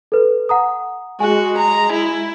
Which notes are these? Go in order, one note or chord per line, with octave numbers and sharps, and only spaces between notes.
A4 B4
F#5 A#5 D#6
G#3 F#4 G#5
A#5
E4